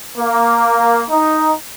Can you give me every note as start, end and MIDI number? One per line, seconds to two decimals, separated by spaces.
0.16 1.02 58
1.09 1.52 63